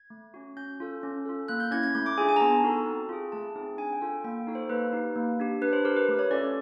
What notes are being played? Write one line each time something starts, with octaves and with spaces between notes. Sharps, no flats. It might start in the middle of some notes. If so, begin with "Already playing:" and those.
Already playing: G#6
A3
C#4 F#4
C#4 G6
F4 A4
C#4
F4 A4
A#3 F#6
G6
C#4 E4 G#6
G#6
A3 G6
D6
D4 F4 G#4 G#5
G#5
A#5
B3 A5
D#4 F#4 A4
C4
F4 G#4
A3 A5
C4 D#4 G#4
D4 G#5
G5
F4 A4
G5
A#3 G5
D#4 F#4 A4
C5
A#3 B4
D#4 G4
A#3
D4 G4
D4 B4
C5
G4 A#4
B4
A3
C#5
C#4 F4 A4 D5